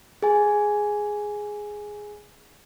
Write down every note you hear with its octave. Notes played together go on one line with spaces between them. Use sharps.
G#4 G#5